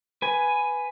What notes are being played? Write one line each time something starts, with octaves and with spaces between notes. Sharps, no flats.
B4 G#5